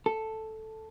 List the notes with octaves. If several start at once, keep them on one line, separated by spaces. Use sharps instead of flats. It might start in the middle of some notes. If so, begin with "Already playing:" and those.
A4